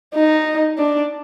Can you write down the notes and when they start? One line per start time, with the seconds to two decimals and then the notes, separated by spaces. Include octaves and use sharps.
0.14 D#4
0.78 D4